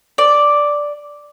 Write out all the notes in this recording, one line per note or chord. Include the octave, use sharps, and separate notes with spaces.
D5